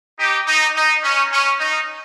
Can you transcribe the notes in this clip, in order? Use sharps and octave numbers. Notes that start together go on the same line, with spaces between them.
D#4 G4
D#4
D#4
C#4
C#4
D#4